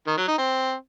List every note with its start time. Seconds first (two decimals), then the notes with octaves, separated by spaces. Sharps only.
0.07 D#3
0.17 F#3
0.28 D#4
0.38 C4